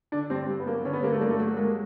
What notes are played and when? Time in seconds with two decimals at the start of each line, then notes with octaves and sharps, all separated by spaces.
0.12 D3 D4
0.30 G2 C4
0.49 G2
0.60 B3
0.67 F#3 A#3
0.76 B3
0.85 D3 C#4
0.93 B3
1.03 G2 A#3
1.12 A3
1.21 G2 A#3
1.30 A3
1.39 F#3
1.57 G#3 A#3